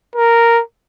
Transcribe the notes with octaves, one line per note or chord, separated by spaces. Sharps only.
A#4